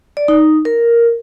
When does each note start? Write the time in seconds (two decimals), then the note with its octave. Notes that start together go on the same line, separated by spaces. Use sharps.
0.17 D5
0.28 D#4
0.65 A#4